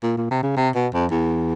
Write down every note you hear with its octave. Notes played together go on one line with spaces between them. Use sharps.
A#2
A#2
C3
C#3
C3
B2
F2
E2